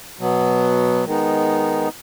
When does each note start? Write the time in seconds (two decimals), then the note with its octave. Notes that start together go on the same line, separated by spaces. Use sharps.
0.19 B2 F#3 B3
1.05 D#3 G#3 B3 D#4